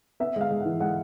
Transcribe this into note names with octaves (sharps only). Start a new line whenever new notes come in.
B3 E5
G#3 F5
G#3
E3 F#5
G#3 F#5